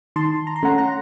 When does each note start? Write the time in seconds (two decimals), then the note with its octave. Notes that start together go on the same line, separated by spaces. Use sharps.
0.16 D#3 A5 C6
0.47 A#5
0.56 C6
0.63 A3 C#4 F#5 A#5
0.78 F#5 A#5